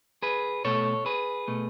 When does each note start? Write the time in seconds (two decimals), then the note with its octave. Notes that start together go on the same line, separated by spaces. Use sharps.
0.22 G#4 B4
0.65 B2 A3 A4 C#5
1.06 G#4 B4
1.48 B2 A3